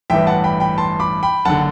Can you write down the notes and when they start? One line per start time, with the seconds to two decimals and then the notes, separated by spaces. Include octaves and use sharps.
0.10 A1 G2 E3 E5 G5
0.27 F#5 A5
0.44 G5 B5
0.60 G5 B5
0.78 A5 C6
1.00 B5 D6
1.23 G5 B5
1.45 F#1 D3 F#5 A5